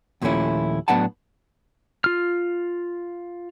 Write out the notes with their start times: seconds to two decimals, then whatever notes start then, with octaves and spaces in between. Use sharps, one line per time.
0.22 D#2 A#2 F3 A3 C#4 E4
0.88 A2 F#3 B3 D4 F#5 A5
2.04 F4 F6